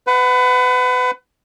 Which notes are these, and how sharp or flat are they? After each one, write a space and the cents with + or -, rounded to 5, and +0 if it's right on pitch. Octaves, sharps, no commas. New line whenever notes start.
B4 +30 F#5 +0